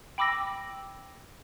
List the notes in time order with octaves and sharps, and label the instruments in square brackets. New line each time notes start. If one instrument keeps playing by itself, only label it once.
[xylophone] G5 B5 D6 E6 A#6